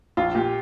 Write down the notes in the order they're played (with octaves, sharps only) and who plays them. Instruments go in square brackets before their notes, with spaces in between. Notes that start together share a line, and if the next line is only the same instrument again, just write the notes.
[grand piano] A#1 [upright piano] F4
[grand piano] A#2 [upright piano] G4